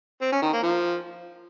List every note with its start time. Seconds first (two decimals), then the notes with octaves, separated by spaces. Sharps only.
0.22 C4
0.32 C#4
0.42 D#3
0.53 A#3
0.63 F3